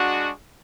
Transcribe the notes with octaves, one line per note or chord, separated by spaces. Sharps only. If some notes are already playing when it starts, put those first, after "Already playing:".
Already playing: G#3 D4 F#4